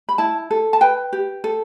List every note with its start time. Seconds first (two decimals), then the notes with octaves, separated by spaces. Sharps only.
0.09 B5
0.18 E4 A5
0.51 A4
0.73 A5
0.81 B4 G5
1.13 G4
1.44 A4